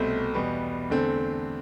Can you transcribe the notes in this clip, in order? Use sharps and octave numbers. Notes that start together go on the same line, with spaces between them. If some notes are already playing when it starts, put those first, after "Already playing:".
Already playing: C2 B2 A3 C4
E2 B2 G3 B3
E2 D3 A3 C4